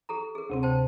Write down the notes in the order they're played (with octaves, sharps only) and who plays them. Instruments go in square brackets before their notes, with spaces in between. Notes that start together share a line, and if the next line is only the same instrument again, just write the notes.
[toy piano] G4 A4 A#5
G#4 A#4
[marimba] D2 C3 C4
[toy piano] C5 G5 A5